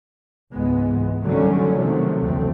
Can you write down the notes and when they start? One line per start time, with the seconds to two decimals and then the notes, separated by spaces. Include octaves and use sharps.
0.51 C#2 G#2 E3 G#3 B3
1.24 D3 D#3 F#3 G3 A3 C#4
1.73 C3 D#3 F3 F#3 A3
2.22 F#1 D2 C#3 E3 A3 C4